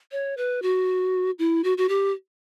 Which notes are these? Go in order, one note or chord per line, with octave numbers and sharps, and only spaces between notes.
C#5
B4
F#4
E4
F#4
F#4
G4